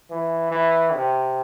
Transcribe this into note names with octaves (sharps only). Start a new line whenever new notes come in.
E3
E3
C3